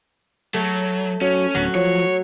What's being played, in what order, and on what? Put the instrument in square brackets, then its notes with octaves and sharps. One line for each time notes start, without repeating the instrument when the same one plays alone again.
[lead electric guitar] F#3 [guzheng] A3
[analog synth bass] F#3 [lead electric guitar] C#4
[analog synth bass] D1 [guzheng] F#3
[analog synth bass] F3 [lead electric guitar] C#5